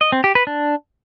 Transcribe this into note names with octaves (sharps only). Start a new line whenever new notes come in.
D#5
C4
G4
B4
D4